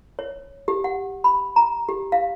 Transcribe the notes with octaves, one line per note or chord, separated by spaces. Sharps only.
C#5
G4
F#5
B5
A#5
G4
F5